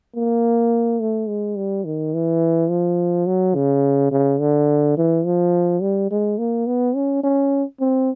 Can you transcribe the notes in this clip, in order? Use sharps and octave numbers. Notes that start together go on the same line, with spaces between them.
A#3
A3
G#3
G3
D#3
E3
F3
F#3
C#3
C#3
D3
E3
F3
G3
G#3
A#3
B3
C#4
C#4
C4